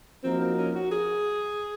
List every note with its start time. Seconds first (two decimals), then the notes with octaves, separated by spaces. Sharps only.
0.23 F3 A#3 C4 D#4 F#4 A#4
0.40 C4
0.58 C#4
0.75 F#4
0.92 G#4